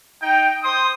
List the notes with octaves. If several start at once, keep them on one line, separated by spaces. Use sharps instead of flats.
D#4 G5
C5 C6 D#6